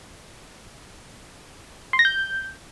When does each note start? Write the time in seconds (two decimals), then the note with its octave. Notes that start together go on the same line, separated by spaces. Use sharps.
1.93 C6
1.99 A#6
2.05 G6